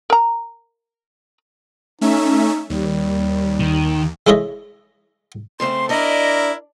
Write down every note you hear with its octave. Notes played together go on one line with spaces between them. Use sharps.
A#4 A#5
A3 C#4 D#4 E5
D#2 G3
D#3
G#3 E4 A4 C#5 D#5 E5
C#3 A3 C4 C6
D4 E4 A#4 D5 D#5